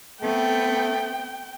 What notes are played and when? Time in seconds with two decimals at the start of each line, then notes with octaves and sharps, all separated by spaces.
0.22 A3 B3 C4 G5